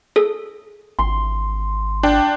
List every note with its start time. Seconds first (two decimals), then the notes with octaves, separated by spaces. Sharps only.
0.16 G#4 A4
0.99 G#1 C6
2.03 D4 G5